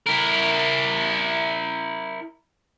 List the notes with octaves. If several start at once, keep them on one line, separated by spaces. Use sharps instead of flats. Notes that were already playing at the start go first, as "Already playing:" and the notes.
E4 A#4